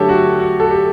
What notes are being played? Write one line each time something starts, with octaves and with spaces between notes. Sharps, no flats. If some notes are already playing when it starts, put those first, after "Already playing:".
Already playing: D3 F#3 A3 G4 A4 C#5
F#4
F#4
A4
G4